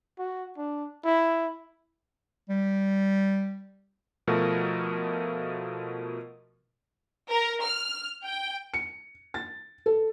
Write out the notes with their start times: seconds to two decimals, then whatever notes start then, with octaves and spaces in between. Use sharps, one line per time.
0.19 F#4
0.57 D4
1.05 E4
2.49 G3
4.27 B2 F3 A3 F#4 A#4
7.29 A#4
7.64 F6
8.24 G5
8.74 C#7
9.34 A6
9.86 A4